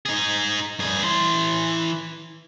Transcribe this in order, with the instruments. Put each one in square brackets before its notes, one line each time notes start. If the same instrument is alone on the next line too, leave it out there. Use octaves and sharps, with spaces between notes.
[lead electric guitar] D#4 G#4
G2 G#4
E3 C6